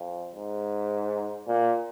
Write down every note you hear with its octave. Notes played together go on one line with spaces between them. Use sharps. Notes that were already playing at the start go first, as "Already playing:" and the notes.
Already playing: F2
G#2
A#2